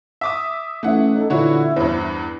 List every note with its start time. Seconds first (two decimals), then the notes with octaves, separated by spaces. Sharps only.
0.21 E5 D6 D#6
0.83 E3 A3 C#4 E5 F#5
1.16 D#4 A4
1.30 A#2 D3 E3 E4 F#4 C#5
1.76 E2 G2 C5